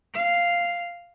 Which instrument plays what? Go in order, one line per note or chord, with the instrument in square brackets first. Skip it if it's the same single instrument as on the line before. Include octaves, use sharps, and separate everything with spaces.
[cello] F5